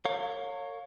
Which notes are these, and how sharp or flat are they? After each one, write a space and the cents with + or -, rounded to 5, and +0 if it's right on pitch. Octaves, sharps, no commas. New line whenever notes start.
A#4 -40 C#5 +0 F5 +25